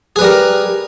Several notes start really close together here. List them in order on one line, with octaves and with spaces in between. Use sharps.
G#4 B4 G3 A#4